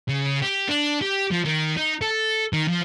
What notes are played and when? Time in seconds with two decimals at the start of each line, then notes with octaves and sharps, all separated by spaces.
0.08 C#3
0.42 G4
0.69 D4
1.02 G4
1.31 F3
1.45 D#3
1.77 D#4
2.02 A4
2.53 D#3
2.68 F3